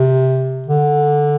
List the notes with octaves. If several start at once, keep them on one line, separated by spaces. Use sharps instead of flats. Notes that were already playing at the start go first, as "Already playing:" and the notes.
Already playing: C3
D3